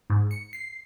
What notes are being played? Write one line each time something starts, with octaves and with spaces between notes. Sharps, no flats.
G#2
C#7
C7